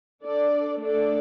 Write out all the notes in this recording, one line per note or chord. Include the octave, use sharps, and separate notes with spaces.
D4 A4 D5
A3 D4 A4 D5